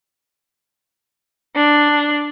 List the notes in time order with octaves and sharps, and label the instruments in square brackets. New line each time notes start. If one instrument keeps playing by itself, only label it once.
[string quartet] D4